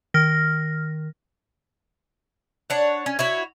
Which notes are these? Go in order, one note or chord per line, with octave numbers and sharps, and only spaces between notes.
D#3 F6 A#6
D4 C#5 F#5
C#4
E4 F#4 C#5